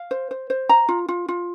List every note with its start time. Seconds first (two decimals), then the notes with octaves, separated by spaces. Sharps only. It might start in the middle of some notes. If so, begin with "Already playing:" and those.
Already playing: F5
0.11 C5
0.31 C5
0.50 C5
0.69 A#5
0.89 F4
1.09 F4
1.28 F4